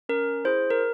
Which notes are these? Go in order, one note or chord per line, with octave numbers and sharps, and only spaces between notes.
C#4 A#4
E4 G#4 C5
A#4